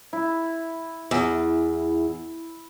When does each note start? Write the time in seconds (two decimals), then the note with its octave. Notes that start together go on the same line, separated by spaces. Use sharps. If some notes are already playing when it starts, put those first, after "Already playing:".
0.13 E4
1.11 E2